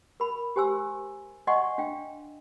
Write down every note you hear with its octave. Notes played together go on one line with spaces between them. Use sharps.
A#4 B5
G4 C5 G#5 C6 E6
D5 D#5 F#5 G#5 C6 C#6
D4 F5 G5